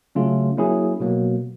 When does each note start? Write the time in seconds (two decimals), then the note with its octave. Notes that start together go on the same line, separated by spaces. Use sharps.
0.15 C#3 F#3 A3 C#4 F4
0.57 F#3 A#3 C#4 E4 G#4
1.00 B2 F#3 A#3